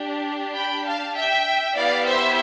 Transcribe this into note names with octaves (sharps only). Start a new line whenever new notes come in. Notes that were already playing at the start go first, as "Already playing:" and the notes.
Already playing: D4 G4
G5 B5
F5 A5
E5 G5
B3 E4 G4 D5 F5
C5 E5